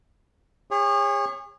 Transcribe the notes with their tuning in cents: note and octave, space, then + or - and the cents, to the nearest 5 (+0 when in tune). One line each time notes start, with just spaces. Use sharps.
G#4 -40 C#5 -15